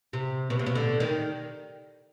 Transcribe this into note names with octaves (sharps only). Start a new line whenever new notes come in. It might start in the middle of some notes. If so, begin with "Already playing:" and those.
C3
B2
C3
B2
D3
D#3